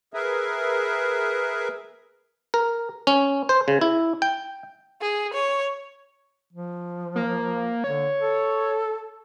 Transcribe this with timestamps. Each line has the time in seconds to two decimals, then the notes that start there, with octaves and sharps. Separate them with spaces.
0.14 G#4 A#4 B4 E5
2.54 A#4
3.07 C#4
3.49 C5
3.68 C#3
3.81 E4
4.22 G5
5.02 G#4
5.34 C#5
6.53 F3
7.16 A#3
7.84 D3 C#5
8.19 A4